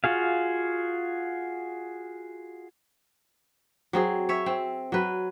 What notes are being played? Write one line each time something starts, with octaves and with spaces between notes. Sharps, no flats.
F4 F#4 G#4 F5
F#3 C4 G#4
C#5 E5
C4
F#3 B4